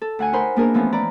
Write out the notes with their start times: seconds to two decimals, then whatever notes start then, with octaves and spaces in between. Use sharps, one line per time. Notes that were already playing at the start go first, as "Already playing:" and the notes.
0.01 A4
0.19 D2 F#5 G#5
0.33 D#4 A#4 C5 B5
0.56 A#3 B3 D4 D#4 G#4 A#4
0.74 E3 F3 A3 B3 C#4 F4
0.92 D5 A#5 B5